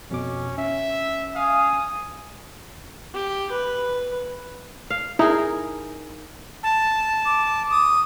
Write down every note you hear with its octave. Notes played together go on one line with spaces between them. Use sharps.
F2 B2 C#4 D6
C#4 E5
F5 G#5 D#6
G4
B4
F5
D#4 E4 G#4 A#4
A5
D6
D#6